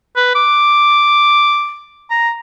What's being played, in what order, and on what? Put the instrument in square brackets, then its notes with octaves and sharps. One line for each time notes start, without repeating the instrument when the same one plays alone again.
[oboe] B4
D6
A#5